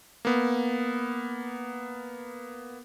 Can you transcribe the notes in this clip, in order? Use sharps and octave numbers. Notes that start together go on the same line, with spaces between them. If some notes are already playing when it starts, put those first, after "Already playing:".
A#3 B3